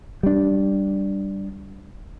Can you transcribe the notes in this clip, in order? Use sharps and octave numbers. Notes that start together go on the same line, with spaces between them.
G3 D4